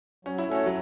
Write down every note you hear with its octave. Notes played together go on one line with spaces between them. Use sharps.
F#3 C#4
E4
A3 C#4 F#4 A4 C#5
F#3